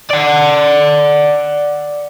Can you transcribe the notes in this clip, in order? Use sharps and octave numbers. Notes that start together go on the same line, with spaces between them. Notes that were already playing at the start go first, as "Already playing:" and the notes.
D5 F#5